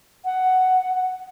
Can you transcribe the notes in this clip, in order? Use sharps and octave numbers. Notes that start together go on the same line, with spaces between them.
F#5